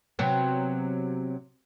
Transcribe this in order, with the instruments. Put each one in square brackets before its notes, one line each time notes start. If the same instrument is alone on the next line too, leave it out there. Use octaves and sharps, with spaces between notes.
[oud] C3 F#3 B3